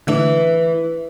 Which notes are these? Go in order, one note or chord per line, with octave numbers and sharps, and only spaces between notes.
D3 E3 A3 D4